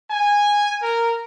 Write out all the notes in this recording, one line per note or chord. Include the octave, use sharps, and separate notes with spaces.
G#5
A#4